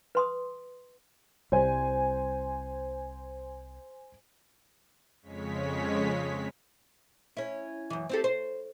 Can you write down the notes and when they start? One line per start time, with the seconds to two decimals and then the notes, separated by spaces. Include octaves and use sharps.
0.15 B4 C6 D#6
1.52 C2 G3 C5 G#5
5.22 F2 C#3 G#3 C#5 B6
7.37 C#4 E4
7.90 F#2 E3
8.09 C4 G4 A4
8.24 C5